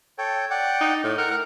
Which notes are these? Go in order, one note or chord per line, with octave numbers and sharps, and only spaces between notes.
A4 C#5 G5
D5 F#5 G5
D#4
A2
A#4 F#5
A#4